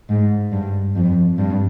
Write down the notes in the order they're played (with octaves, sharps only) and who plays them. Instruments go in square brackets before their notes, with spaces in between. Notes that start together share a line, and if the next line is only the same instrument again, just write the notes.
[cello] G#2
G2
F2
G2